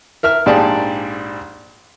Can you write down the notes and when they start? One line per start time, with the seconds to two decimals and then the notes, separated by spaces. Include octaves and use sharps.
0.23 A#4 E5 F6
0.46 A#1 G#2 G4 G#4 D5 A5